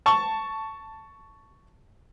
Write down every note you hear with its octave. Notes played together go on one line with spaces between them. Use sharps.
A5 C#6